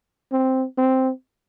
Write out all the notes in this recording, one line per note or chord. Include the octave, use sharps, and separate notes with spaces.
C4
C4